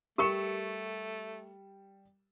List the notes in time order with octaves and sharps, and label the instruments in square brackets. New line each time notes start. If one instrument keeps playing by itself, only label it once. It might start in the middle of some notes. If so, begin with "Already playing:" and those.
[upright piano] G3 C#7 E7 [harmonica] A3 [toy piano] G4 A#4 C#6